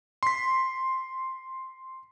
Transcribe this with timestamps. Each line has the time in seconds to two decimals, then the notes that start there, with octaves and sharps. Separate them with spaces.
0.23 C6 B6